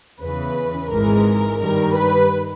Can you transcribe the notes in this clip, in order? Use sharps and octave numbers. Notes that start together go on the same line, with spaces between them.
E2 C#3 E3 B4
G#1 G#2 E3 G#3 A#4
G2 D#3 G3 A#4
B4